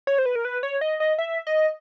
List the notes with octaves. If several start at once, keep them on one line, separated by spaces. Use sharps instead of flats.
C#5
C5
B4
A#4
B4
C#5
D#5
D#5
E5
D#5